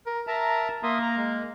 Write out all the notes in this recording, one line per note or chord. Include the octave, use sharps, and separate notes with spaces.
A#4
A#4 E5 A5 A#5
A#3 E5 C6 D#6
A#5
G#3